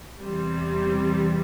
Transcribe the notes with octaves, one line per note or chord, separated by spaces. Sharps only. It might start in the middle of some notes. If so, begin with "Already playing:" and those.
E2 C3 E3 G3 C4